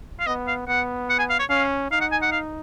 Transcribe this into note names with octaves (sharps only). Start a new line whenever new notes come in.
F5
B3 D#5
F5
B3 F#5
F#5
G#5
F5
C#5
C#4 F5
D#4 F5
F#5
G#5
F#5
F5